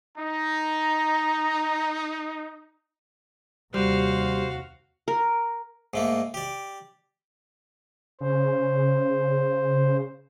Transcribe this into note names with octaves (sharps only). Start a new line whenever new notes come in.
D#4 A#5
D#2 C3 G3 F#4 C5 F5
A#4
G#2 A3 A#3
G4 D5
C#3 C5